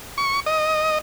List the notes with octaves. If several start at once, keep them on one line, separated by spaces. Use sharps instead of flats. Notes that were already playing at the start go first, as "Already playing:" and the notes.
C#6
D#5